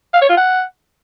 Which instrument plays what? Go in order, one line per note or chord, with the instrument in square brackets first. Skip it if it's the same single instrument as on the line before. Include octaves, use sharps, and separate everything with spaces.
[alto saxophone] F5
C#5
F4
F#5